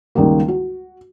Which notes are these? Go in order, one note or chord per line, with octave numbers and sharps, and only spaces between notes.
C#2 D#3 G3 G#3 A#3
F#4